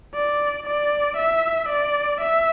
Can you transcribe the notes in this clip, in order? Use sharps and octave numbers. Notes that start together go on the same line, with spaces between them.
D5
D5
E5
D5
E5